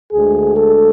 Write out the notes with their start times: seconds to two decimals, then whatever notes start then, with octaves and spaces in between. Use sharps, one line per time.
0.12 D2 D3 G#3 G#4
0.57 A4